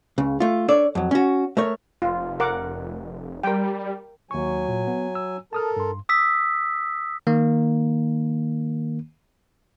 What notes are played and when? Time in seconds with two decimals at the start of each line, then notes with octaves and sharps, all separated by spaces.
0.18 C#2 C#3
0.40 A3 F4
0.68 D4 A4 C#5 D5
0.95 F2 F#3
1.11 C#4 F#4
1.57 A3 A#4 C#5
2.02 F1 F4
2.40 A#4 F#5 D6
3.43 G3 A#4 G5
4.31 D#2 F#3 G#5 C#6
4.68 A#2
4.87 B3
5.15 E6
5.53 A4 A#4 A5 D#6 F6
5.76 G2 C6
6.09 D#6 E6 B6
7.27 D#3 A#3